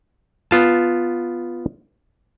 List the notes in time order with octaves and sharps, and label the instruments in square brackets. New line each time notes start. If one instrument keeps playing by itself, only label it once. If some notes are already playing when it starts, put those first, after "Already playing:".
[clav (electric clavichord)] B3 F4 A5